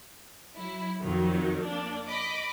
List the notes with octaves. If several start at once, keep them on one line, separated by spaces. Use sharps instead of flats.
F#3 E4
F2 D#3 F#3
A#3 D4
D#5 B5 D6